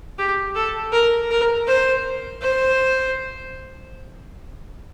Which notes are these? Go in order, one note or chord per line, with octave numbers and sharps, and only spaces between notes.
G4
A4
A#4
A#4
C5
C5